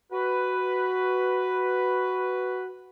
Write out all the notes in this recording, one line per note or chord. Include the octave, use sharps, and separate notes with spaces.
F#4 B4